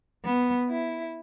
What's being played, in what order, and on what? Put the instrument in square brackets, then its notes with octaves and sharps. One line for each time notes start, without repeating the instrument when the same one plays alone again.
[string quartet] B3
E4